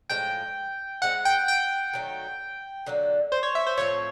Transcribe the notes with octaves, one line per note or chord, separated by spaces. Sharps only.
A2 F3 G#3 G5
G#3 C4 E4 G#4 F#5
G5
G5
D#3 F#3 A3
D3 F#3 A#3
C5
C#5
E5
C5
A2 F3 A3 C4 C#5